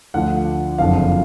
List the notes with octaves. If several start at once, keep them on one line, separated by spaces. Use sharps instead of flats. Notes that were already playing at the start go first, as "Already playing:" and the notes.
D2 D3 F3 F#5
F#1 F2 D3 F3 F5